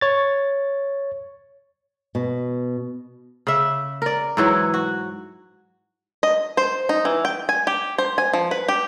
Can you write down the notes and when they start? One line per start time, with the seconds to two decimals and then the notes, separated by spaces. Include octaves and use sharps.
0.01 C#5 A6
2.15 B2
3.47 C#3 E5
4.02 A#4 D5
4.37 G#2 E3 F#3 C#5
4.74 F#4
6.23 D#5
6.57 C5
6.89 D#4
7.05 E3
7.25 G5
7.49 G#5
7.67 G4
7.98 C5
8.18 G#5
8.34 F3
8.51 B4
8.68 G4